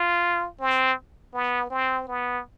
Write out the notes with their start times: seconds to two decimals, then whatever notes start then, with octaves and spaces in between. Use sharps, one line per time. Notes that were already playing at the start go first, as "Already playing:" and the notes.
Already playing: F4
0.60 C4
1.33 B3
1.70 C4
2.07 B3